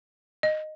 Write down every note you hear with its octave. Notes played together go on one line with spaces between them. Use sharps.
D#5